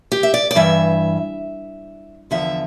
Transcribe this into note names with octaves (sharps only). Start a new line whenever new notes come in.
G4
E5
D5
D5
G2 E3 E5
E2 D3 F3 E5